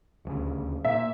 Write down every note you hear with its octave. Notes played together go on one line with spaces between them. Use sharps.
D#1 D2 C#3
A#2 E5